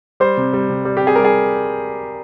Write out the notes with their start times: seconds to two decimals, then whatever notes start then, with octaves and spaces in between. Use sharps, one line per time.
0.20 G3 C5
0.37 C3
0.53 G3
0.69 C3
0.85 G3
0.97 G4
1.03 C3 G#4
1.16 G3 A#4
1.25 G#4